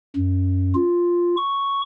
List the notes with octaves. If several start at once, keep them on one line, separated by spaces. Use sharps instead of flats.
F#2
F4
C#6